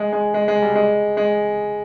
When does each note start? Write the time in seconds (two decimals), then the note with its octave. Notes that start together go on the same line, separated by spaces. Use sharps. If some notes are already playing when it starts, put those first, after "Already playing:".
Already playing: G#3
0.13 G#3
0.34 G#3
0.48 G#3
0.62 G3
0.75 G#3
1.17 G#3